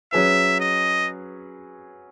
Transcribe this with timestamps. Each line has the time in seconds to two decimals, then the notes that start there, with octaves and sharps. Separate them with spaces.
0.12 F#3 C#4 G#4 B4 E5
0.60 D#5